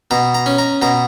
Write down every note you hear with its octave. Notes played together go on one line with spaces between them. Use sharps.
B2 A#5
A#5
C#4
A#5
B2 A#5